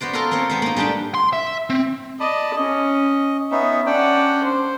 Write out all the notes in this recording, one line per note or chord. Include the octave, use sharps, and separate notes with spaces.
B3 F#4 C5 D5
F4 A4 A#4 G5 A#5 C6
A#3 C4 C5 C#5
G#3 B3 C5
A#3 D#4
G3 A3 D4 G#4 G5
C6
E5
C4
D5 D#5 A5 B5
C#4 D#5
B3 C#4 D#4 E5
C#4 D4 D5 F#5 G5
C5